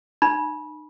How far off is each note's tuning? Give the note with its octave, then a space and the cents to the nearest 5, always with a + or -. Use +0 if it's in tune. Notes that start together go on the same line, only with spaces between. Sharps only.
D#4 -40 B5 -25